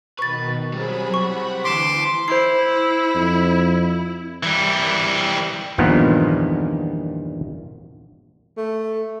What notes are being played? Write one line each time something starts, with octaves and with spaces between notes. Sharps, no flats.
B2 D#3 B4 C#6 A6
F#3 G3 C4 G#4 B5
F#5 B5 C#6
D2 E3 C6 D6 B6 E7
E4 C5 C7
F2
E3 G3
E2 G2 A#2 D#3 F3 B3
A3